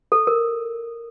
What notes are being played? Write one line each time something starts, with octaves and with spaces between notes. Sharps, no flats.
A4
A#4